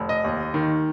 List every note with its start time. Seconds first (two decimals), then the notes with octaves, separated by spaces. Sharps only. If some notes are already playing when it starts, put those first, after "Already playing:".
Already playing: F1
0.09 D#5
0.24 D#2
0.54 D#3